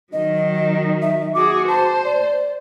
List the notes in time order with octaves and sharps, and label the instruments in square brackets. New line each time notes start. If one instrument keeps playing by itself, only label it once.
[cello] D#3 F#3 [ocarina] D#5
[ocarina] E5
[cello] F#4 G#4 [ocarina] D6
[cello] C5 [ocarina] A5
[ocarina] D5